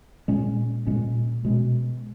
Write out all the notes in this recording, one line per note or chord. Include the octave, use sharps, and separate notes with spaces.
A#2 G#3 C#4
A#2 G#3 C#4
B2 G#3 C#4